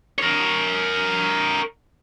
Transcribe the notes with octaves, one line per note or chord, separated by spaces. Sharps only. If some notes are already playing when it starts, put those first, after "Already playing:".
A#4 C#5